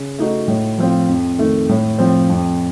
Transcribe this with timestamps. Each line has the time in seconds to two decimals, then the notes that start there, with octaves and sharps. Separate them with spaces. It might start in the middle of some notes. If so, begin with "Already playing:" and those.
Already playing: C#3
0.19 A3 D#4 F#4
0.48 A2
0.78 F3 C4 F4
1.08 F2
1.38 D#3 A3
1.69 A2
1.99 F3 C4
2.29 F2